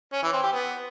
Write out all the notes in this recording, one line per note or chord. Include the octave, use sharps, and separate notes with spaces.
C#4
E3
C4
G4
B3